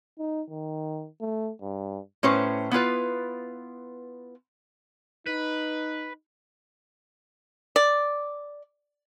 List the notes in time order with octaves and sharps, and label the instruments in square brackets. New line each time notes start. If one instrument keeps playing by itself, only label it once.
[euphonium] D#4
D#3
A3
G2
[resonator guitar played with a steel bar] A2 C#4 B4 C5
B3 E4 F4 B4
[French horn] D#4 [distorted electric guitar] B4
[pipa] D5